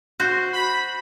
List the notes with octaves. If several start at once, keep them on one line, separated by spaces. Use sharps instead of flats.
F#4 C5
B5